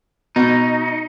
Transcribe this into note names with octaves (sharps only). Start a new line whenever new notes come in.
B2 D#4